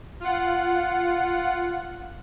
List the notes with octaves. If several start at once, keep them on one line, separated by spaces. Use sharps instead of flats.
F4 F#5